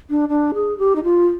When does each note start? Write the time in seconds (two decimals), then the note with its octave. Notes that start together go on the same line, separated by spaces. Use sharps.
0.10 D4
0.29 D4
0.54 G#4
0.78 G4
0.96 D#4
1.04 F4